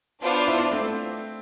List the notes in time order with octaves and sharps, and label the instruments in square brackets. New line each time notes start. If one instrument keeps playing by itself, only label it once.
[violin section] B3 D4 F4 C5
[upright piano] E4
D4
A3 C4